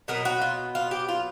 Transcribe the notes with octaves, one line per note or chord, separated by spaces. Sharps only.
B2 F#3 B3 A#4
F#4
F4
F4
G4
F4